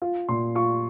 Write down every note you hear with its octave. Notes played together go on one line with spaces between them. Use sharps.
F4
A#2 C6
F4 C#6